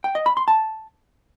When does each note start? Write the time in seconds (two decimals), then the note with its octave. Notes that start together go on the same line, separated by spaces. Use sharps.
0.04 G5
0.15 D#5
0.26 B5
0.37 C6
0.48 A5